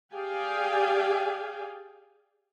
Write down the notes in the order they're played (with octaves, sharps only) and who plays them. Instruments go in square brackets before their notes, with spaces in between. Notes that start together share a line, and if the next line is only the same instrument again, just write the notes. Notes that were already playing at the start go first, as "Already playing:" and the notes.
[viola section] G4 G#4 D5 F5 G5 G#5